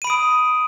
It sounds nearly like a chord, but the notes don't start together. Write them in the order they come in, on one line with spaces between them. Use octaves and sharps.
D#7 B5 D7 D#6